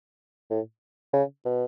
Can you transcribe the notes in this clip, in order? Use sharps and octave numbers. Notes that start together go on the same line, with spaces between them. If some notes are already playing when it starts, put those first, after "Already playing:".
A2
C#3
B2